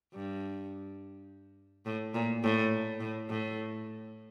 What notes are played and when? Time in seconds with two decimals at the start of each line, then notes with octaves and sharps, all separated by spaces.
0.14 G2
1.86 A2
2.14 A#2
2.44 A2
3.00 A2
3.29 A2